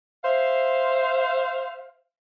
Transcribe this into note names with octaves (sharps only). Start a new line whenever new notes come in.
C5 E5 F5